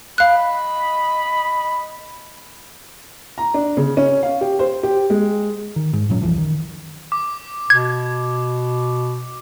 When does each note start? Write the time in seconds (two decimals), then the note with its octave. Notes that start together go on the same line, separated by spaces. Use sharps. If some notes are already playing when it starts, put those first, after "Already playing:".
0.18 D#5 F5 B5 F#6
3.38 A#5
3.54 D4
3.77 C#3
3.97 C#4
4.23 F5
4.41 G4
4.59 C5
4.83 G4
5.10 G#3
5.76 D#3
5.93 G#2
6.09 F1 A#2 F#3 C#4
6.22 C2 F#2 E3 F3
6.38 D#3
7.12 D6
7.70 B2 G#6